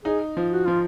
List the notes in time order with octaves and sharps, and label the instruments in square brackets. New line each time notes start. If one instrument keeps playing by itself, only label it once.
[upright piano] D#4 [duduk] G#4
[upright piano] F3
[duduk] F#4
[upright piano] F3 [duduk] F4